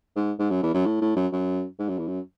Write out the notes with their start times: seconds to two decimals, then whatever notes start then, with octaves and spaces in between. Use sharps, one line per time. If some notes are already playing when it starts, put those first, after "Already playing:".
0.16 G#2
0.39 G#2
0.50 F#2
0.62 E2
0.74 F#2
0.86 A2
1.01 A2
1.16 F#2
1.32 F#2
1.79 G#2
1.88 F#2
1.98 E2
2.08 F#2